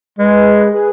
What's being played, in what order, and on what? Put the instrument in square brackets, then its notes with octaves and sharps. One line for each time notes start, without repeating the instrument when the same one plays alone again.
[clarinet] G#3 [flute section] G#4 B4
[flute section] G#4 B4